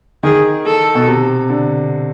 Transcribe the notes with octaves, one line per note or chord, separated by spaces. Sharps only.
D#3 G#4
A4
B2
C3
D3